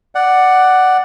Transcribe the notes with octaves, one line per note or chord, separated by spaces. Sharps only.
D5 F#5